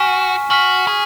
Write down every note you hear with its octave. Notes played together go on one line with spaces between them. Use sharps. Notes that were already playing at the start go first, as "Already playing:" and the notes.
Already playing: F#4 G#5 C#6 F6 B6
F#4 G#5 C#6 F6 B6
G#4